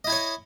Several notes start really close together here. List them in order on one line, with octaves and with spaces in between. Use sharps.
D#5 E4 G#5 C#5